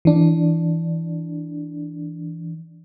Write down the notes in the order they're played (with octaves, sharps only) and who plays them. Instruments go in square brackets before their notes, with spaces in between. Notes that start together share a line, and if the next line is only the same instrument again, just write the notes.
[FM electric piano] E3 D4